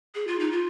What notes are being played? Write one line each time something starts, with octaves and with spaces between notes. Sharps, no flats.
G#4
F4
D#4
F4